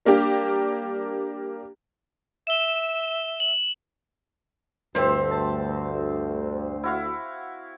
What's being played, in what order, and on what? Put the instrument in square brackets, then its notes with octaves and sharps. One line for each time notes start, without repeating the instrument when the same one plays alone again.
[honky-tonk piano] G3 A#3 D4 G4
[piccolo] E5 [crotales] E7 G7
[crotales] F#7
[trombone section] D2 [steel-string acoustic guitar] G2 A3 [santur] C4 C5
[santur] A5
E4 F#4 F5